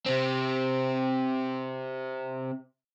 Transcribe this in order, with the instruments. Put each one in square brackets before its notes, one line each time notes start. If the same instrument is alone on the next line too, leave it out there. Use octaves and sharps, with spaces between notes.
[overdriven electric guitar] C3 C4